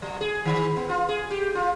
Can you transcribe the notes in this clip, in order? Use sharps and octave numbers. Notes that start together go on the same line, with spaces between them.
F#3
G#4
D#3
B3
F4
G#4
G4
F4